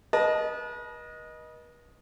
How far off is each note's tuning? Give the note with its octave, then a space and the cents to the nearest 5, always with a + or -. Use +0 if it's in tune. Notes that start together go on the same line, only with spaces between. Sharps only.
B4 -40 D#5 +0 A5 -30